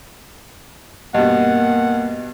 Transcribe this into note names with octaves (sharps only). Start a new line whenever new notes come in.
G2 B2 A#3 D#5 F#5